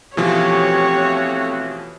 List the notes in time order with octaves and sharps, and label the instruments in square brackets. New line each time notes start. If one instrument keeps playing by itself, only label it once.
[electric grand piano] B2 E3 F3 [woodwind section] A3 C4 F#4 [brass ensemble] G4 [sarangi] C#5